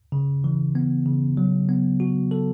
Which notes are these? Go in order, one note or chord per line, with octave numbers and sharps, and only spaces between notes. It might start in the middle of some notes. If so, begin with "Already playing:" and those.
C#3
E3
B3
C#3
F#3
B3
F#4
A4